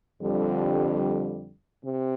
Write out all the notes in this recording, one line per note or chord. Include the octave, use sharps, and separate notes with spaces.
F2 D3 G3
C3